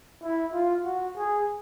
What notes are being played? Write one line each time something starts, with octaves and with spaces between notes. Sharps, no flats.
E4
F4
F#4
G#4